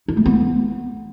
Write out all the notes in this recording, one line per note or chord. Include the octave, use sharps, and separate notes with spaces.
E4
A3
B3